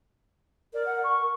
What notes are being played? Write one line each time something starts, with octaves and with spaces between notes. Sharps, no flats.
A#4 D5
F#5
C#6